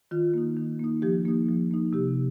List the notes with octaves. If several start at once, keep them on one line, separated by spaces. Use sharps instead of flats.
D#3 F4
A#3 D#4
D#3
A#3 D#4
F3 G4
A#3 D#4
F3
A#3 D#4
C3 G4